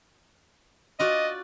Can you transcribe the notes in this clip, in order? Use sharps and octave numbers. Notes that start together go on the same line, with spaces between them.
F4 F#4 D5 D#5